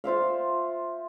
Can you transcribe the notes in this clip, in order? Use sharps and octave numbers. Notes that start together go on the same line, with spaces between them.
F4 C5 E5 F5